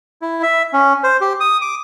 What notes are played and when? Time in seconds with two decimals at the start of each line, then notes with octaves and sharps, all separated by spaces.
0.22 E4
0.43 E5
0.73 C#4
1.04 C5
1.21 G4
1.40 D#6
1.61 D6